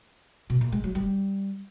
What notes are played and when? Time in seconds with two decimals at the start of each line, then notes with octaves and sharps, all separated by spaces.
0.50 B2
0.61 A#2
0.72 G#3
0.84 F#3
0.95 G3